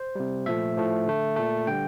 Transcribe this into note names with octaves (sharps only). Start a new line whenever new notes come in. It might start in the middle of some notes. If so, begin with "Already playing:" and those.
Already playing: C5
C3 G3
A#2 F3 A3 E5
A2 F3 A3
D3 A3
A#2 A3
D3 G3 G5